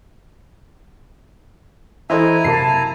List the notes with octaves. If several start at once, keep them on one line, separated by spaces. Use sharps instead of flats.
E3 E4 A4 C5 D#5 E5 G#5 A#5
F#2 C3 A#3 A5 C7